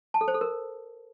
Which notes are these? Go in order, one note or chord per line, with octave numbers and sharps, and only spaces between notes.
A5
A4
C5
A4
A#4